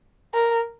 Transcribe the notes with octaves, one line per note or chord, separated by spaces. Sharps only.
A#4